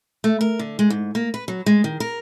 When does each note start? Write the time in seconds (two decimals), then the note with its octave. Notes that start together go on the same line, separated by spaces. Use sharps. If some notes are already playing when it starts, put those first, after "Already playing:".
0.24 A3
0.41 A#4
0.59 D3
0.79 G#3
0.90 G#2
1.15 A#3
1.34 B4
1.48 F#3
1.66 G#3
1.84 D#3
2.00 A#4